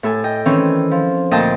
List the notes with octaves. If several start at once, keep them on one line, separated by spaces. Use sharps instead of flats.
A2 A4 G#5
D#5 G5
D#3 E3 C4 C#4
F3
D2 A#2 D#5 G5 A5 D#6